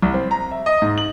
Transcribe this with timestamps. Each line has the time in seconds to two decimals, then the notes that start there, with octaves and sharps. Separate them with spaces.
0.02 C2
0.14 C4
0.31 A#5
0.51 E5
0.66 D#5
0.82 G#2
0.98 F#7